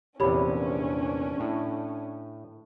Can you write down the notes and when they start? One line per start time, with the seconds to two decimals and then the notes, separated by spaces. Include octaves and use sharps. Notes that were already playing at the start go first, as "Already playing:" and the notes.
0.20 A#1 E2 C3 C#4 D4 G4 C#5 B5
1.40 A2